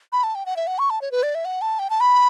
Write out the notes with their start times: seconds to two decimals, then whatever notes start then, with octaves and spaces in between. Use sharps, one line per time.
0.12 B5
0.24 A5
0.35 G5
0.46 F#5
0.57 E5
0.67 F#5
0.79 C#6
0.90 A5
1.02 C#5
1.12 B4
1.23 D5
1.35 E5
1.45 F#5
1.62 A5
1.79 G5
1.90 A5
2.00 B5